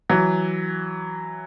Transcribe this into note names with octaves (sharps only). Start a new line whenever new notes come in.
E3 F#3